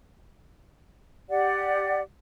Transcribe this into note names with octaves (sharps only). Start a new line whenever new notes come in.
G4 D5 F#5